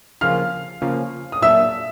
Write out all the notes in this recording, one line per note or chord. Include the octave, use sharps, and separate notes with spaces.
C#3 F3 A#3 C#4 F4 F5 F6
C#3 F3 A#3 C#4 F4
D#6
A#2 F#3 A#3 D4 E5 E6